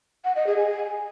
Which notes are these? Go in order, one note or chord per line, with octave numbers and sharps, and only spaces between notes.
F#5
D#5
G#4
G#5